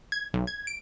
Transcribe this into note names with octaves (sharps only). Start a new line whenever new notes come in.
G#6
B1
G#6
D7